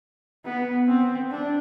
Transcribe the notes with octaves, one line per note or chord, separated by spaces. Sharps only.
B3
C4
D4